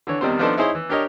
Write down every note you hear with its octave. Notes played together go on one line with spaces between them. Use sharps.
D3 E3 C#5
E2 D#3 G3 C4 C5
F3 B3 D4 D#4 A4 C5
D#4 E4 G#4 C5 C#5 D#5
E3
D4 G4 A#4 C#5 D#5